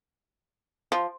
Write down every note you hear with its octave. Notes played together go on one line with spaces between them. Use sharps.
F3